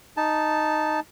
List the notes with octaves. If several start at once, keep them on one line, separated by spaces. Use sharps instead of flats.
D#4 A5